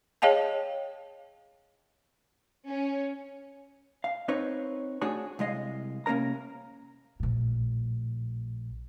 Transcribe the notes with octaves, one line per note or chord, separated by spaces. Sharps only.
G#4 C#5 D#5 F5 G5 A5
C#4
F5
C4 D#4 B4 C#5
A3 D4 F#4 G#4 C#5
C2 G#3 D#5 F5
C3 A#3 C#4 A#4 A#5
A#1 A2